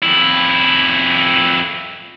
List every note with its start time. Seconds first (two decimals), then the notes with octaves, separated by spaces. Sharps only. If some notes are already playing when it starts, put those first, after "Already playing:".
0.03 F2 E4